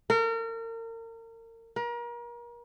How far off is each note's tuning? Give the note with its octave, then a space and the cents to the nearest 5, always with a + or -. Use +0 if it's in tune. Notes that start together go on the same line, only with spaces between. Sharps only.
A#4 -35
A#4 +35